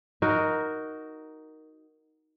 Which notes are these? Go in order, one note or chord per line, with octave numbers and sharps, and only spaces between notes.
D#4 F#4 A#4